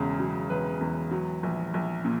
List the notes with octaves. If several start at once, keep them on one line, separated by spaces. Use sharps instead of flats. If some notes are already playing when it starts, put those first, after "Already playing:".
Already playing: E1 E2 C#3
F#3
E1 B4
E2
F#3
A#1
A#1
A#2